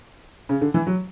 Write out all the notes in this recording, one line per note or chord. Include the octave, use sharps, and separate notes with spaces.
C#3
D3
E3
F#3